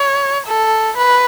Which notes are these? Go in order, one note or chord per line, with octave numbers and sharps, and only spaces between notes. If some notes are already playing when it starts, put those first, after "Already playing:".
Already playing: C#5
A4
B4